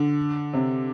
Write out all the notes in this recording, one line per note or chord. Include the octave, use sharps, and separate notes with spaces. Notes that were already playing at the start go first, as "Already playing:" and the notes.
Already playing: D3
C3